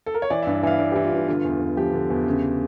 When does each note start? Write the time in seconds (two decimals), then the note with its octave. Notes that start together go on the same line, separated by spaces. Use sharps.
0.06 A4
0.14 A#4
0.22 C#5
0.30 E3 D5
0.42 E5
0.47 G2
0.63 E3 F5
0.79 G2 D5
0.92 G4
0.96 E3
1.04 F4
1.12 G2 G4
1.28 D3 F4
1.45 E2
1.61 E2
1.77 F3 G4
1.94 D3
2.10 E2
2.27 C#3